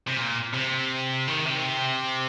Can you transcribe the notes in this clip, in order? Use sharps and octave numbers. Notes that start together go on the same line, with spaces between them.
C3
A#2
C3
D#3
C3